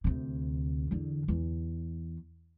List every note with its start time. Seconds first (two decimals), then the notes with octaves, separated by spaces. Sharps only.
0.04 D2 C3
0.91 E2 D3
1.28 E2